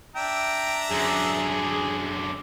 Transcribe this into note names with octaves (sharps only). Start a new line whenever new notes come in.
D4 E5 G5 A#5
F#2 D3 G#4